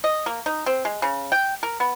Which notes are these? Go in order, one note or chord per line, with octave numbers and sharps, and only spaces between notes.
D#5
A#3
D#4
C4
G#3
C#3
G5
A#4
B3